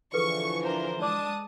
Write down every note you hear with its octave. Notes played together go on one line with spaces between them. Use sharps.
D3 E3 F3 G#4 A4 B4 C#6
D4 A#4 C5
G#3 D4 D5 A5 D6 D#6